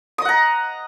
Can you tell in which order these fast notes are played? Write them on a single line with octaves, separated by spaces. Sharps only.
D#6 D#5 F#5 A#5